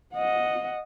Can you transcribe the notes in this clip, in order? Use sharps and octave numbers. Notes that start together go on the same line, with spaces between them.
D#5 F#5